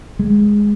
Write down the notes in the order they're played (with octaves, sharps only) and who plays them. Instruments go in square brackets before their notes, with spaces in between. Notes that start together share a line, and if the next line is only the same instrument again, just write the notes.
[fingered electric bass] G#3